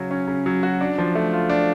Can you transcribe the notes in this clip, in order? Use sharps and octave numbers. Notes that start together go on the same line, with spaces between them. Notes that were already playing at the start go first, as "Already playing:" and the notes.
Already playing: C#3 F#3 C#4 F#4
C#4
C#3
F#3
F#4
D4
F3
A3
F4
D4